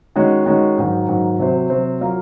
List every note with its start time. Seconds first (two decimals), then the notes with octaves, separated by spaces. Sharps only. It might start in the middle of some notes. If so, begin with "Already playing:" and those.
0.16 D#3 G#3 C#4 F#4
0.46 D#3 G#3 C#4 F#4
0.78 G#2 D#3 F#3
1.08 G#2 D#3 F#3
1.39 C3 F#3 C4 F#4 C5
1.70 C3 F#3 C4 F#4 C5
2.01 F#3 A#3 F4 A#4